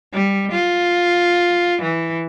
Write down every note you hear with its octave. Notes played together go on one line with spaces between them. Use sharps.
G3
F4
E3